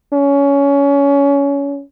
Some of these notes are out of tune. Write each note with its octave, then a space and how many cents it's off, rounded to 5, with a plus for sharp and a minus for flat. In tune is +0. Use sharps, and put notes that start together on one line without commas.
C#4 +20